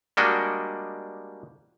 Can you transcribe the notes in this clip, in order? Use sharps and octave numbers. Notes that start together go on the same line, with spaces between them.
G3 G#3 A#3 D4 F#4 D#5